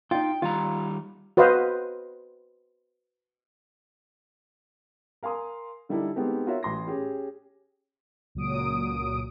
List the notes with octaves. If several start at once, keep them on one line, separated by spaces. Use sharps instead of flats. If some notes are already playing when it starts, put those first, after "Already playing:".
D#4 F4 G5
D#3 G3 F4 A#5
F#4 B4 C5 D#5 F5
A#4 F5 G#5 C6 D#6
D3 G3 D#4 E4 A4 D5
G#3 B3 C4 D#4 G4 A4
F4 F#4 A#4 C#5 E5 F5
A1 C6 A#6
C#4 G4 G#4
C#2 A#2 F#3 D#6 D7